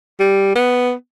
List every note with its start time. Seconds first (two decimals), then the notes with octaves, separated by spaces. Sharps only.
0.20 G3
0.55 B3